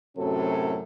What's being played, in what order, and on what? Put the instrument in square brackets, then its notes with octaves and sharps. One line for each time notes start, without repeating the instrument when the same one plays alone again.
[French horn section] F#2 A2 C3 F#3 C#4 A4